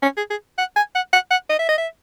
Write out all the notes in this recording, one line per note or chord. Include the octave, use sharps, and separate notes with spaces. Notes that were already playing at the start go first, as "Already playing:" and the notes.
C#4
G#4
G#4
F#5
G#5
F#5
F#5
F#5
D#5
E5
D#5
E5